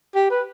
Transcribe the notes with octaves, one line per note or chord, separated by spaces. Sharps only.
G4
B4